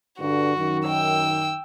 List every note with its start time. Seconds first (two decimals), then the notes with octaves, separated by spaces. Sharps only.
0.19 G2 D3 F#4
0.57 F#2 D#3
0.87 G5 E6